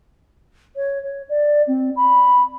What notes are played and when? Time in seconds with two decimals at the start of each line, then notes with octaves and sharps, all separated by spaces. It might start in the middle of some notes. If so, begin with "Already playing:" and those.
0.76 C#5
1.03 C#5
1.29 D5
1.67 C4
1.96 B5